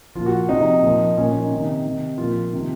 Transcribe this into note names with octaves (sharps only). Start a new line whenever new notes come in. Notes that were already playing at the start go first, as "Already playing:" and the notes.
A#2 F3 F4
F#4
C3 F3 D#4
A#2 F3
A#2 F3 C#4
D#4
C3 D#3
C3 D#3
A#2 F3 F4
C3 D#3